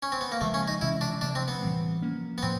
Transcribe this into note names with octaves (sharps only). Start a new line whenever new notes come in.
C#4
C4
B3
A#3
C#3 F3 G#3 A3
C#4
D#4
C3 E3 G#3 C#4 E4
D4
C3 F3 A3 D4
C4
B3
A2 E3 G3 C4
F3 A#3 C#4
B3
A2 F3 C4